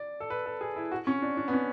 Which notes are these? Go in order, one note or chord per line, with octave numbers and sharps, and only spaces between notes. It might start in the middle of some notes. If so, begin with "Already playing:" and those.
Already playing: D5
A4
B4
A4
G#4
E4
F#4
C#4
D4
D4
B3
C#4